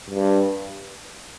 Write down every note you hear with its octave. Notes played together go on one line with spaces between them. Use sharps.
G2